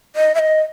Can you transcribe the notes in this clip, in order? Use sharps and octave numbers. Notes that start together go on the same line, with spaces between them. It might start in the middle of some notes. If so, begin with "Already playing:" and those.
D#5
E5
D#5